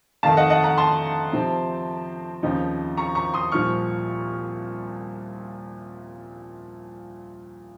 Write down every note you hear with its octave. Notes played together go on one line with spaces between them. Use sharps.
F2 D#3 A3 D#4 F5 A5
D#5 F#5
D#5 F#5
F#5 A#5
A5 C6
C3 F3 C4
D#2 C#3 F3 C4 D#4
A#5 C#6
A#5 C#6
C6 D#6
C2 A#2 F3 C#6 F6